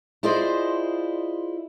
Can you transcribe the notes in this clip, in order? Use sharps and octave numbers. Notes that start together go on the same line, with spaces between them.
E4 F4 G#4 C5 D5 D#5